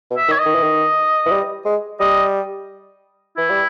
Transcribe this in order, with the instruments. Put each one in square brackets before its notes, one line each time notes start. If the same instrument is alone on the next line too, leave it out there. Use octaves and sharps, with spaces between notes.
[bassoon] B2
[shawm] E5
[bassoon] D#3
[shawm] C#5
D#5
[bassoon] D#3
E3
D#3
E3
G3
G#3
[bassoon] G3 [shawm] D#5
[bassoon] E3 [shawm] E4
[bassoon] G3